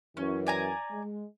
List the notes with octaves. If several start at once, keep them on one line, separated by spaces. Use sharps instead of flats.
F#2 E3 C#4
D5 G#5 A#5
G#3